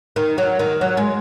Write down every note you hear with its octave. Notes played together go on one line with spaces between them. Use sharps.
D#3
F#3
D#3
F#3
G#3